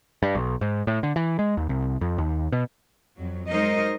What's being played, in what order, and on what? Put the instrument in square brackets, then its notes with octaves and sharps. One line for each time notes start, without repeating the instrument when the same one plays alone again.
[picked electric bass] G2
B1
G#2
A2
D3
E3
G#3
D#2
C2
F2
D#2
B2
[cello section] F2 F#3
F#3 G#3 D#4 A#4 C5 D#5